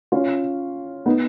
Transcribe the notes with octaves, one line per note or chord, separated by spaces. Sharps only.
C#4 F4
B3 D#4